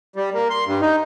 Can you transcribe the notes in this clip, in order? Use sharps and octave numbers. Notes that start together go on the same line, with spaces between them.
G3
A#3
C6
G2
D#4